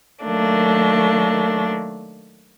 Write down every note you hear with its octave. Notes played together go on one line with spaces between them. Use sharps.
D#3 F#3 A3 A#3 D4